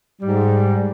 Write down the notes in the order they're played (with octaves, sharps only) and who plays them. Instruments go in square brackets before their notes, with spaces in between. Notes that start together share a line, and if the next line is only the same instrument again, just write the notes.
[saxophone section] G#2 G3